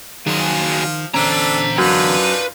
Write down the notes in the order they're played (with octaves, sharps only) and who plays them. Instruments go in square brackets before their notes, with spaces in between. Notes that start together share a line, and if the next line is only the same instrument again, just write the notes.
[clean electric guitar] D#3 [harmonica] F3 F4 [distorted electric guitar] F#3 G#4
[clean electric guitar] E2 D3 C#4 [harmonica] D4 A4 [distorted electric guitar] C5 A#5
[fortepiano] F#2 [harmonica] D4 D#4 F4 [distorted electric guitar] B4